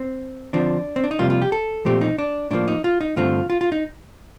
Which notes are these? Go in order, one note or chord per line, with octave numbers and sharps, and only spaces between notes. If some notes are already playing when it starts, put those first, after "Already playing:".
Already playing: C4
D3 F3 C4 D4
C4
D4
D#4
F2 C3 G3 A#3 F4
F4
G4
A4
A#2 F3 A3 C4 G4
D#4
D4
A2 F3 A#3 D4
D#4
F4
D#4
G2 D3 A3 C4 F4
F4
F4
D#4